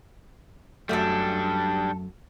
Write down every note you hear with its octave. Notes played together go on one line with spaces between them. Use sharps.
F#2 G3 A3 D4 A4 F#5